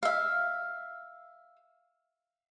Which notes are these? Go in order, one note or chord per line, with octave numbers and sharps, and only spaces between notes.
E5 F5